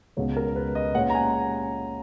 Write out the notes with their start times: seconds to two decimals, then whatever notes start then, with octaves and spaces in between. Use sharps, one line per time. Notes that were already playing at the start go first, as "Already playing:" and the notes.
0.17 C#2 B2 G#3 B3 C#5
0.37 A#4
0.56 B4
0.75 D#5
0.95 A#2 G#3 C#4 F#5
1.10 A#5
1.15 G#5